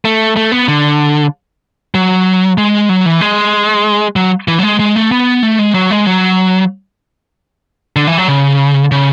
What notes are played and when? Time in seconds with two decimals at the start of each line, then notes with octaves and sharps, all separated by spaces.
0.05 A3
0.36 A3
0.52 B3
0.68 D3
1.95 F#3
2.58 G#3
2.89 F#3
3.06 E3
3.21 G#3
4.16 F#3
4.48 E3
4.59 F#3
4.63 G#3
4.80 G#3
4.96 A3
5.11 B3
5.43 A3
5.59 G#3
5.74 F#3
5.91 G#3
6.06 F#3
7.96 D3
8.07 E3
8.18 F#3
8.28 C#3
8.92 C#3